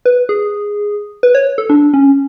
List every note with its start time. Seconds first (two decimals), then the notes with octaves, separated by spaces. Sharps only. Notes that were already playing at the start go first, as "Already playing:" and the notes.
0.06 B4
0.29 G#4
1.23 B4
1.35 C#5
1.58 A4
1.70 D4
1.94 C#4